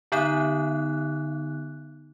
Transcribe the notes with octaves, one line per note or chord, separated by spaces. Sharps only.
D3 B3 D#4 F#6